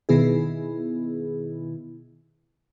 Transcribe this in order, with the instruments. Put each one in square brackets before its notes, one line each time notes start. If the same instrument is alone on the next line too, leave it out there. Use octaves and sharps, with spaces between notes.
[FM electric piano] B2 D#3 B3 E4 G#4